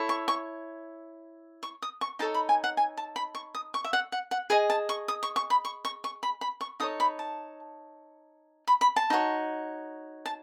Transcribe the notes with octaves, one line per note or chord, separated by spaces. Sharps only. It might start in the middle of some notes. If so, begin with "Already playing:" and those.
Already playing: E4 A4 C#5
C#6
C#6
C#6
D#6
C#6
D#4 A4 C#5 A5
B5
G#5
F#5
G#5
A5
B5
C#6
D#6
C#6
E5
F#5
F#5
F#5
G#4 D#5 G#5
A5
C#6
D#6
C#6
C#6
B5
C#6
C#6
C#6
B5
B5
C#6
D#4 A4 C#5 D#6
B5
A5
B5
B5
A5
D#4 F#4 C#5
A5